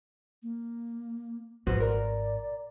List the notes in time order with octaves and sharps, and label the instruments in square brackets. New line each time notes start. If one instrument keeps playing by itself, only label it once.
[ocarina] A#3
[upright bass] G#1 [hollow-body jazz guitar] F#4 B4 C5
[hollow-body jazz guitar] A#4 [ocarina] D5